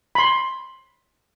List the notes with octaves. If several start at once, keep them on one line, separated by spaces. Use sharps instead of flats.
B5 C6